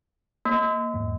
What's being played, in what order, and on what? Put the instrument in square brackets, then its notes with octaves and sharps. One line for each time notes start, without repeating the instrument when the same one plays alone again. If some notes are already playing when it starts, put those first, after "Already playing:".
[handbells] A#3 C#5
[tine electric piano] E2 G#2